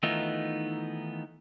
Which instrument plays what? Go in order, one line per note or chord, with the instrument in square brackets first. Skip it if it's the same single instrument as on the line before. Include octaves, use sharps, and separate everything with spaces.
[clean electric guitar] D#3 E3 A3 B3 D#4 F4